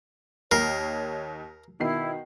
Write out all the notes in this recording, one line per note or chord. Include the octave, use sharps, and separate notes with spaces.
D#2 A#4 C#5 C7
B2 D#3 E4 C7